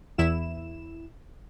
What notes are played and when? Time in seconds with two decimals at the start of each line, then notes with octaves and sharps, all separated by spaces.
0.18 E2 E4 E7